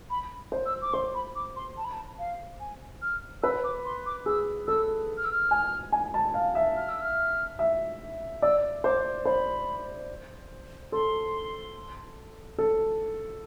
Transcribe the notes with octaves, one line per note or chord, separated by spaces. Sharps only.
B5
C5
E6
D6
C5 C6
B5
D6
C6
A5
B5
A5
F5
G#5
F6
B4 E6
D6
C6
D6
G#4 E6
A4 E6
F6
E6
F6
G#5
G#5
A5
F5
E5
F6
E6
F6
E5
D5 E6
C5 D6
C5 B5
A4 C6
A4